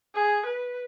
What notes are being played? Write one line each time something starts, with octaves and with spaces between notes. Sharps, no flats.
G#4
B4